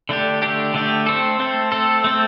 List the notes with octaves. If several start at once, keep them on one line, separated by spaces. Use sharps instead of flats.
D3 A3 D4 G4
D3 A3 D4 G4
D3 A3 D4 G4
A3 C4 A4
A3 C4 A4
A3 C4 A4
A3 C4 A4